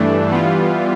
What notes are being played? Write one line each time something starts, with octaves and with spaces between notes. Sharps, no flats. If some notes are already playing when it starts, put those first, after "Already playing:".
Already playing: G2 E3 A3 D4
E3 G3 B3 F4